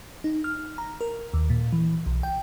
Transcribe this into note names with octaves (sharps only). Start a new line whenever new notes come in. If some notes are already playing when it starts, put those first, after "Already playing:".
D#4
F6
A#5
A#4
D#2
A#2
E3
B1
G5